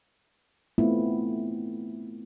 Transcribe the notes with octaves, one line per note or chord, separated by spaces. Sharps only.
A3 B3 C4 E4 F4